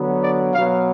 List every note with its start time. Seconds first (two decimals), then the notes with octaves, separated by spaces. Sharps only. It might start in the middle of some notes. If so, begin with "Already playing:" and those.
Already playing: D3 F#3 B3
0.23 D5
0.54 B2 F#3 B3 F5